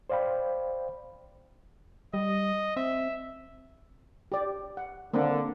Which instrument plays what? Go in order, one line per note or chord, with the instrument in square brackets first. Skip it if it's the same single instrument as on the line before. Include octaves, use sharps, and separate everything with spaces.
[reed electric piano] C5 D5 F5 G5 B5
[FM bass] G3 [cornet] D#5
[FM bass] C4 [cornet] E5
[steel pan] G4 D5
F#5
[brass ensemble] D3 [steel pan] A#3 C4 D4